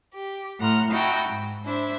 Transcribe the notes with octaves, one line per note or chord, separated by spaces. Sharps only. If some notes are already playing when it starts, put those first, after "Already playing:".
G4
A2 F#5 A#5 C6 F6
D#4 E4 F#4 G5 A5
G#2
D4 E4 C5 E5